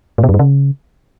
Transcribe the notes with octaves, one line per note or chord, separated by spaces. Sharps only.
A2
B2
F#2
G2
C#3